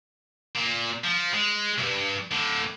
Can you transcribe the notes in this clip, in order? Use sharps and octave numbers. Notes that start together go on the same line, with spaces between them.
A#2
F3
G#3
C2 G2
A2 D3